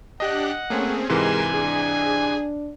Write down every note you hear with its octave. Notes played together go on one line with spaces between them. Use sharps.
D4 G4 D#5 F#5 F#6
A3 A#3 C4 C#4 G#4
G#2 C3 E3 G#3 A#4 G#5 C6 E7
D4 G#4